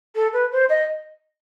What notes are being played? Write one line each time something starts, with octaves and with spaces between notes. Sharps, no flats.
A4
B4
C5
D#5